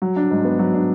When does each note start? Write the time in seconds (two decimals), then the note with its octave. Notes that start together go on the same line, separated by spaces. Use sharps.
0.02 F#3
0.16 D4
0.31 G#2
0.45 B3
0.59 F#3
0.74 D4